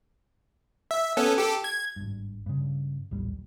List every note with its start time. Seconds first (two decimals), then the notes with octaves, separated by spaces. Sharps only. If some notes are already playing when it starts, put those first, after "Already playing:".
0.91 E5
1.17 B3 C#4 A4
1.38 G4 A4
1.64 G#6
1.96 G#1 G2
2.46 G2 C#3
3.11 A#1 D#2 A2 G3